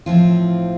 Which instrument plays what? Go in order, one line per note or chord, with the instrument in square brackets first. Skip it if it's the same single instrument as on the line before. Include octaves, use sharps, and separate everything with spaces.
[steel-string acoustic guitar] A2 F3 C4 F4